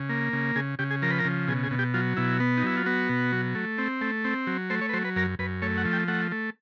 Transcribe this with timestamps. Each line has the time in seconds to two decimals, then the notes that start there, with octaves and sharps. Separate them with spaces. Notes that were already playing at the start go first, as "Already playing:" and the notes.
Already playing: C#3
0.09 A#3
0.33 C#3
0.56 C#3 G#4
0.79 C#3 G4
0.91 G#4
1.02 F3 A#4
1.10 B4
1.19 A#4
1.25 C#3
1.47 B2 G#4
1.63 G#4
1.71 B2
1.79 G4
1.94 F#3 F4
2.17 B2 E4
2.40 B3
2.57 D#4
2.63 F#3 E4
2.77 F4
2.86 B3 F#4
3.09 B2
3.32 F#3
3.55 A3
3.78 C4
4.01 A3
4.24 C4
4.47 F#3
4.70 A3 C5
4.81 C#5
4.89 B4
4.93 F#3 C5
5.05 B4
5.16 F#2 A#4
5.39 F#2 B4
5.62 A3 C#5
5.77 F#5
5.85 F3
5.93 G5
6.08 A3 F#5
6.32 A3